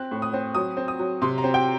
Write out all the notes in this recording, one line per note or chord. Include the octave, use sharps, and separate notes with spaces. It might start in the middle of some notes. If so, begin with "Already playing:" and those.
Already playing: C4 F#6
A2
D#6
C4
F#3 D#6
C4
D#6
F#3
C3 C6
A#5
C4
G5